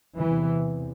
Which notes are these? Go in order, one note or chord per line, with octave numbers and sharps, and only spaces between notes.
E2 C3 E3